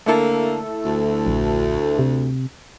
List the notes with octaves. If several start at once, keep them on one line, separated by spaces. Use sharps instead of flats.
D3 A3 A#3 E4 A4
D2
A#1
C3